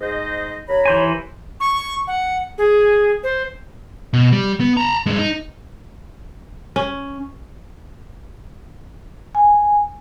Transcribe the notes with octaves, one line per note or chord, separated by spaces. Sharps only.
G#2 C5 D#5
D#2 C#5 A#5 B5
E3 C5 G#5
C#6
F#5
G#4
C5
B2
G3
B3
A5 A#5
G2 G#3
D#4
C#4
G#5